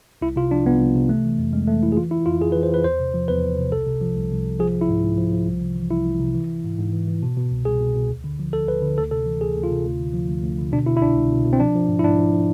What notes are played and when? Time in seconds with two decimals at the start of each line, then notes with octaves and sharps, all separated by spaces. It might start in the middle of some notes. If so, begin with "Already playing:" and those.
0.21 C2 E4
0.36 C3 F4
0.51 F3 D4
0.65 C2 B3
0.80 C2
0.95 C3
1.09 E3 A3
1.25 E3
1.39 F2
1.53 F2 G#3
1.67 E3 A3
1.83 E3 E4
1.92 G#4
1.97 E3 F4
2.11 E3 E4
2.26 F2 F4
2.41 F2 G#4
2.52 B4
2.55 E3
2.63 C5
2.70 E3 B4
2.84 E2 C5
2.99 C3
3.14 F3
3.28 E2 B4
3.43 E2
3.58 C3
3.72 C2 A4
3.87 C3
4.01 F3
4.16 C2
4.31 C2
4.45 C3
4.59 F3 G#4
4.74 F3
4.81 E4
4.89 G#2
5.04 G#2
5.18 F3
5.33 F3
5.47 C2
5.62 C3
5.76 E3
5.91 C2 E4
6.06 C2
6.20 C3
6.35 E3
6.49 E3
6.64 G#2
6.79 G#2
6.93 E3
7.07 E3
7.23 B2
7.37 B2
7.51 C2
7.65 C2 G#4
7.80 B2
7.95 B2
8.09 D2
8.24 D3
8.39 F3
8.53 D2 A4
8.67 D2 B4
8.82 D3
8.98 D2 A4
9.11 C3 A4
9.26 E3
9.41 D2 G#4
9.56 D2
9.63 F4
9.71 C3
9.85 D2
10.00 D3
10.13 F3
10.28 D2
10.43 D2
10.58 D3
10.72 B2 D4
10.86 B2 E4
10.97 E4
11.01 C2 D4
11.16 C2
11.31 B2
11.45 B2
11.53 C4
11.60 F3 D4
11.75 F3
11.89 G#2
11.99 E4
12.04 G#2 D4
12.18 F3
12.33 F3